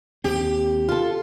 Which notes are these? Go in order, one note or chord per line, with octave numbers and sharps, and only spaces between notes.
D#2 C4 G4
F4 A4